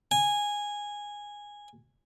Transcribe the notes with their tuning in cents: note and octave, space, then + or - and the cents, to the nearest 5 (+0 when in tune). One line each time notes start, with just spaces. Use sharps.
G#5 -10